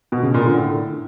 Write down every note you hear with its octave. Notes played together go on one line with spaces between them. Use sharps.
B2
C#3
A#2
D3
A2